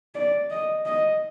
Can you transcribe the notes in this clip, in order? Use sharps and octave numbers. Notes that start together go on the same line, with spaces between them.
D5
D#5
D#5